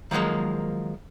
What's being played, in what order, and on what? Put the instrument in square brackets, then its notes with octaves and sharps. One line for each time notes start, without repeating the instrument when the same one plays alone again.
[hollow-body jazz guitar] D#3 F3 F#3 G#3 A#3